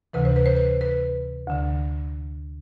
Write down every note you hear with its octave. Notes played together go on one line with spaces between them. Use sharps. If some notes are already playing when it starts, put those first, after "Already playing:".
D2 C3 E3 B4
C5
B4
C5
B4
B4
D2 D3